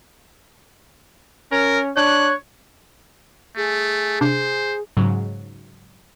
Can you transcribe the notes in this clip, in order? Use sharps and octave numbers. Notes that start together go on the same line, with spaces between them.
C#4 A#4
D4 C#5 F#6
A3 G#4
C3 D4 C5 D6
G#2 C#3 F#3